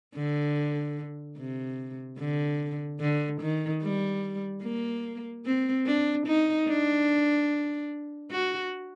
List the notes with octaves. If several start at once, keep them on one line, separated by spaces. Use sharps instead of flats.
D3
C3
D3
D3
D#3
G3
A#3
C4
D4
D#4
D4
F#4